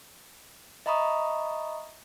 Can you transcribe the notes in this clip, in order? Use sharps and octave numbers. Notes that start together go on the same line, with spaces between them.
D#5 E5 A#5 B5 C#6 D#6